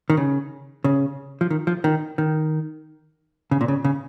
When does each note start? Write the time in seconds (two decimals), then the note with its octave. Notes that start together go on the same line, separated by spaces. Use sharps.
0.10 D#3
0.17 C#3
0.84 C#3
1.41 F3
1.50 D#3
1.67 F3
1.84 D#3
2.18 D#3
3.51 C#3
3.61 A#2
3.68 C#3
3.85 C#3